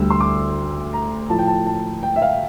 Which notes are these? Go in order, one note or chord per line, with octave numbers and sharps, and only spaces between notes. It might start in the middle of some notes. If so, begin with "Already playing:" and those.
Already playing: D2 D3 G3 E6
C6
D6
A#5
A2 F3 A5
G5
A5
A5
G5
E5
F5